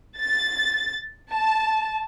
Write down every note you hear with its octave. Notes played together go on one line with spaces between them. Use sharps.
A6
A5